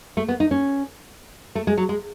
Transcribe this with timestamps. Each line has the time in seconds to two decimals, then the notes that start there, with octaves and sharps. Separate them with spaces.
0.17 A3
0.28 B3
0.40 D#4
0.51 C#4
1.55 A3
1.67 G#3
1.77 F#3
1.89 G#3